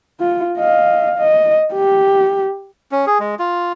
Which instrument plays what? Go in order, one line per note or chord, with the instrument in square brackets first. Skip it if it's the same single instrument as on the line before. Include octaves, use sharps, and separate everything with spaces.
[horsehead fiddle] F4
D#5 F5
D#5
G4
[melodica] C#4
G#4
G#3
F4